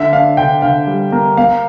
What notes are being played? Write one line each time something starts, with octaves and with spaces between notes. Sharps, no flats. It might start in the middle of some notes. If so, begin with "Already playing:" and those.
Already playing: D3 E5
D4 F5
D3 G5
D3 F5
G3
A#3
A#3 F5